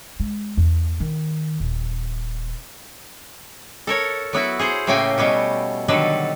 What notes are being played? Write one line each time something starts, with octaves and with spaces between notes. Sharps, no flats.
G#3
E2
D#3
D#1
A4 A#4 C#5
F#3 B3 E4 F#4
G#4 C5 F#5
A2 C#3 A3 A#3 G5 G#5
B2 G3 B3 C#4
D3 D#3 F#3 G3 A4 B4